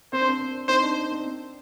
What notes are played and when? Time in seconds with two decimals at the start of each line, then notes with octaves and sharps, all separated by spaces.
0.13 C4 C5
0.21 D4
0.29 C4
0.68 C4 D#4 C5
0.83 D4
1.11 C4